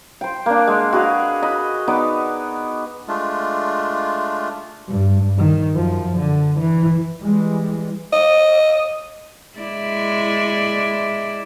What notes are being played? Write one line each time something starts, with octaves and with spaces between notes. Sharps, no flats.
C5 G5
A#3 D4
G#3 F#5
F#4 G#4 B4 F5
D#5 B5
B3 D#4 D5
G#3 A3 D4 F4
G2
D#3
F#2 F3
D3
E3
E3 G3 G#3
D#5
G#3 E4 D5